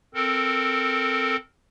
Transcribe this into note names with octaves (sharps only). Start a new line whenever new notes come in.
C4 A4 A#4